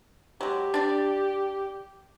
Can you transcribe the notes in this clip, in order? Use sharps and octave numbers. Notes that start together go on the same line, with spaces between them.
F#3 G#3 G4
D4 D5